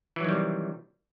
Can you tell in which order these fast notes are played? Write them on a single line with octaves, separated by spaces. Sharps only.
E3 F#3 D#3 G3 C3